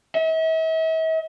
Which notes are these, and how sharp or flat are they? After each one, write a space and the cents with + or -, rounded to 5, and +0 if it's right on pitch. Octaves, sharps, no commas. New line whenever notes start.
E5 -45